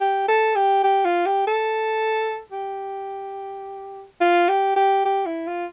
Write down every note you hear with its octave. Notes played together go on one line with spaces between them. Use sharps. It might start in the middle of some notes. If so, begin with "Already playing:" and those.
G4
A4
G4
G4
F4
G4
A4
G4
F4
G4
G4
G4
E4
F4